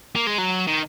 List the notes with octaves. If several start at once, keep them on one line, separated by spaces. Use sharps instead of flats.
A#3
G#3
F#3
D#3